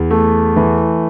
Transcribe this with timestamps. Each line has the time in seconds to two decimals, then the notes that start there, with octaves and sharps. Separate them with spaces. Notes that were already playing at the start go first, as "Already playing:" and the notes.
Already playing: E2
0.11 A3
0.56 E3